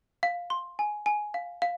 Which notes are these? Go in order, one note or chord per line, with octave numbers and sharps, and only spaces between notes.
F5
C6
G#5
G#5
F5
F5